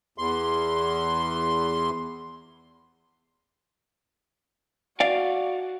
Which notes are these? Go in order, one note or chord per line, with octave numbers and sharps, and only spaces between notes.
E2 C6
F#4 D5 F5